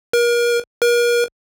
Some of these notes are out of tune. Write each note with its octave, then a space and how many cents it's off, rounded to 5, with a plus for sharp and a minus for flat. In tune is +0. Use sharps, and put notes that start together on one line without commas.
A#4 +35
A#4 +40